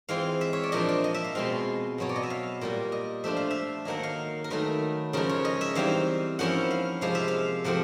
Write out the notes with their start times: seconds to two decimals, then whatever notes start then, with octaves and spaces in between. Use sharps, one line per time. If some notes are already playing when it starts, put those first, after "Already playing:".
0.09 E3 G#3 C4 F4 F5
0.41 E5
0.53 C#5
0.63 D5
0.72 A#2 F3 A#3 D4 F4 D#5
0.89 D5
1.04 D#5
1.14 E5
1.24 F5
1.35 B2 G#3 C4 F4 F5
1.98 B2 F#3 B3 C#5
2.09 D5
2.16 D#5
2.23 E5
2.30 F5
2.61 A#2 G3 A#3
2.92 D#5
3.24 F3 A3 D4 F4 E5
3.37 F5
3.51 E5
3.85 D#3 F#3 A#3 D#4 F#5
4.03 F5
4.44 A#4
4.50 D#3 F#3 A3 B4
5.13 C#3 F3 G#3 A#4
5.29 C#5
5.45 D#5
5.61 E5
5.75 E3 G3 C4 D#4 F5
6.39 F3 A#3 C#4 E4 F#5
6.71 F5
7.01 C3 F3 G#3 F5
7.15 E5
7.28 F5
7.64 C3 F3 A3 C4 F#5